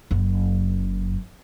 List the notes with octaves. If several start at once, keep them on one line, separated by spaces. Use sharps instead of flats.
F#1 F#2